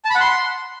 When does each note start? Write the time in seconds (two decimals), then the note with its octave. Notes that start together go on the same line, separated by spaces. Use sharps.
0.05 A5
0.10 B5
0.15 F#5
0.20 C6